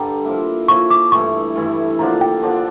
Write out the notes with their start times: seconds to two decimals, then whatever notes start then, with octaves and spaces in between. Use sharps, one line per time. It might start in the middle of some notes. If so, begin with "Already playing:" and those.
Already playing: G2 D3 G3 A#5
0.24 F3 A#3 E4
0.68 F3 A#3 E4 C#6
0.90 D6
1.12 G2 E3 A3 E4 C#6
1.56 G2 E3 A3 E4
1.99 D3 F3 A#3 D4 A#5
2.21 G5
2.43 D3 F3 A#3 D4